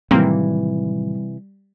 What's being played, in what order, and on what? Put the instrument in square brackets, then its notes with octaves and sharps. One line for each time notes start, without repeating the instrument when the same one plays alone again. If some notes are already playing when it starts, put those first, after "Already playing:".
[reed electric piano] A2 D#3 F#3 [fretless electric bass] C3 E3 [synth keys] G3 [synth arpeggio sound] A#3 C4